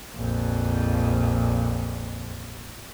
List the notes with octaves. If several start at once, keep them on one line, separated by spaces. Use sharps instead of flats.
A#1 F2